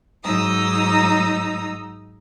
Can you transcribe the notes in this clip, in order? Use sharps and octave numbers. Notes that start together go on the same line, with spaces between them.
G#2 F#3 D#4 A#5 D#6 E6